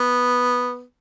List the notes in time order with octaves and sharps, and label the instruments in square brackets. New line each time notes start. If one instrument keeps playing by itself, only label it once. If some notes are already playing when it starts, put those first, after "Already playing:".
Already playing: [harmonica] B3